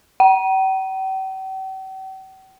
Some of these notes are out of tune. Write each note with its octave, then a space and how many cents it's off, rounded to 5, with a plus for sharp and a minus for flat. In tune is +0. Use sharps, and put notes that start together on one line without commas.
G5 -45